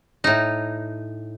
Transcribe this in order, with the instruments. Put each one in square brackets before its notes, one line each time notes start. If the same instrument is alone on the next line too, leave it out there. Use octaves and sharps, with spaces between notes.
[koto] A2 D#4